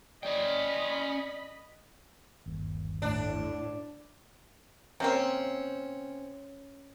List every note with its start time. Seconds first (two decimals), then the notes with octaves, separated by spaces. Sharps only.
0.23 C#4 D5 D#5 G5 B5
2.46 G1 D#2
3.02 A2 D4
5.00 C3 A#3 C4 C#4